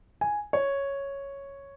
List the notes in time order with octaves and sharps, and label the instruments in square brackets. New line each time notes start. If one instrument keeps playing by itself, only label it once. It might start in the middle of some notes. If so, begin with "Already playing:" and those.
[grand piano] G#5
C#5